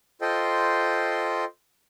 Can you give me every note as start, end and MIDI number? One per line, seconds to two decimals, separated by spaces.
0.21 1.44 65
0.21 1.44 69
0.21 1.44 72
0.21 1.44 75
0.21 1.44 79
0.21 1.44 84